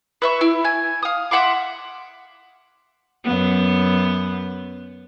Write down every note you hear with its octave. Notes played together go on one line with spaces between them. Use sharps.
B4 E5 C#6
E4
G#5
F5 D#6
E5 F#5 C6 D6
F#2 B3